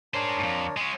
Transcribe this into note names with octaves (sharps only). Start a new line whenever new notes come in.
D4 G#4 A#4 C5 C#5
F2 G#2
G#3 C#4